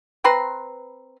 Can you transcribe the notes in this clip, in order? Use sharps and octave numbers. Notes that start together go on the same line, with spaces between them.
C4 B4 A#5 C6